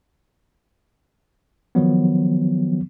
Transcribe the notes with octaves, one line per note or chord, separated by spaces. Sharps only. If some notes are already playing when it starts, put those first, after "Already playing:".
D#3 F3 F#3 B3